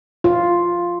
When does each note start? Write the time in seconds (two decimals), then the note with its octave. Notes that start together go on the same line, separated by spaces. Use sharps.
0.24 F4